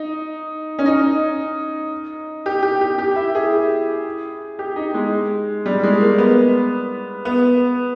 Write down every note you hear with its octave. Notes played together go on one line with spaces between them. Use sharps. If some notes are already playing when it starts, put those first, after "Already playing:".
Already playing: D#4
C#4
D#4
G4
G4
G4
G4
E4
G#4
G4
D#4
G#3
G3
G#3
A#3
B3
B3